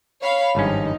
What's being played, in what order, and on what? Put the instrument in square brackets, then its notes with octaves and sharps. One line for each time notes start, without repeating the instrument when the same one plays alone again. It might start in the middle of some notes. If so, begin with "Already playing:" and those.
[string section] C#5 F5 B5
[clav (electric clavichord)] G#1 G2 C#4 [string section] F3 D#4